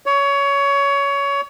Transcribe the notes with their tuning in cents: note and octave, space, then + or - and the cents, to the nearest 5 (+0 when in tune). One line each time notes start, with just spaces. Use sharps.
C#5 +20